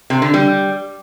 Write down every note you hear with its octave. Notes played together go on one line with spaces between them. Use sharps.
C3
D3
G3